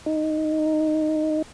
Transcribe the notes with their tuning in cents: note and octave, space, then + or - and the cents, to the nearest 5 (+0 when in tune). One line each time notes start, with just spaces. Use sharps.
D#4 -5